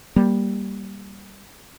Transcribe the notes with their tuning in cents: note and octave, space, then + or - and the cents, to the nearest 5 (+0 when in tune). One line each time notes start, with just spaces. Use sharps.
G3 +0 A#3 +10